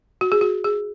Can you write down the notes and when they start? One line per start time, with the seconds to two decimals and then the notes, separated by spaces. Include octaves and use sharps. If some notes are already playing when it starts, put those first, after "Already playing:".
0.21 F#4
0.32 G#4
0.41 F#4
0.64 G#4